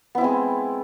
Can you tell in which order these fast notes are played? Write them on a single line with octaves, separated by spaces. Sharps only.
B3 E4 C4 G#3